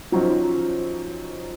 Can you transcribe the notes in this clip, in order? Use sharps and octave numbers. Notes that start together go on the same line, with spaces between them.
F3 F#3 C#4 D#4 C5